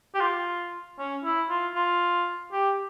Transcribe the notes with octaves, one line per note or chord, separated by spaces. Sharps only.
G4
F4
C#4
E4
F4
F4
G4